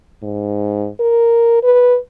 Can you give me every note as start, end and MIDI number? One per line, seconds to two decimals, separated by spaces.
0.23 0.88 44
1.00 1.61 70
1.63 1.98 71